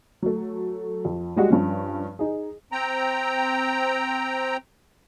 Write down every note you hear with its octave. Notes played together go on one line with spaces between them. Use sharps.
F#3 A3
F2
G3 G#3 F#4 G4
G2 F3 C#4
D#4 G#4
C4 G5 A#5